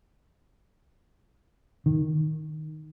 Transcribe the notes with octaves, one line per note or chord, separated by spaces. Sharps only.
D#3